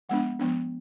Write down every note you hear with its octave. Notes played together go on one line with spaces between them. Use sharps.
F3 G#3 B3 D4 F#5
F3 G#3 B3 D4